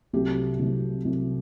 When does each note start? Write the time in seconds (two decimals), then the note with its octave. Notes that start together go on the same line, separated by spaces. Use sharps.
0.13 C2 C3 F#3 A3 G4
0.59 C2 C3 F#3 A3
1.05 C2 C3 F#3 A3